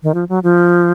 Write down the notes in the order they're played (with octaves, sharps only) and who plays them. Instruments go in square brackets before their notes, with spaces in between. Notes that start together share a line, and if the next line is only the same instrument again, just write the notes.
[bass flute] D#3
F3
F#3
F3